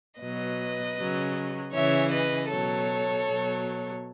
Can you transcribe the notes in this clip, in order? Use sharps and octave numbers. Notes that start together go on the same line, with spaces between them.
B2 F#3 B4 D#5
C#3 F#3
C#3 E3 C#5 E5
B4 D#5
B2 F#3 A4 C#5
B2 F#3